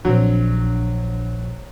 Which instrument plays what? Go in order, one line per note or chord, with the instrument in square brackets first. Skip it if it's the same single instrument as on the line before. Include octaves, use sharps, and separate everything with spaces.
[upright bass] A#1 D4 [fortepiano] F#3 C4